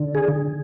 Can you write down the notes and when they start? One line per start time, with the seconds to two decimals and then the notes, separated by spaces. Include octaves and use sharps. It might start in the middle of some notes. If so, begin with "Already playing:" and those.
Already playing: D3
0.15 G#4